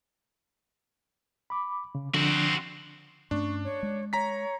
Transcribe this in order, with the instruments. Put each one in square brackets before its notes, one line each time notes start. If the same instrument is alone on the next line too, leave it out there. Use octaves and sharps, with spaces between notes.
[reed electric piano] B5 D6
C#3
[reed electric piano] D3 F3 D4 [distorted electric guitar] C4 F#4
[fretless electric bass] G2 A3 C#4 [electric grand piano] D4 [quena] C#6
[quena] C#5
[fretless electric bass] G#3
[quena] C#5 [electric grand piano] A#5 B6